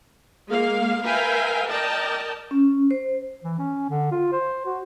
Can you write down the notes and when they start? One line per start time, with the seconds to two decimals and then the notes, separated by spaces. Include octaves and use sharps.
0.47 G#3 A#3 F5
1.04 A#4 B4 E5 F5 G5 G#5
1.68 A#4 D5 D#5 G5 A5
2.51 C#4
2.91 C5
3.44 E3
3.59 C#4
3.90 D3
4.12 F4
4.32 C5
4.66 F#4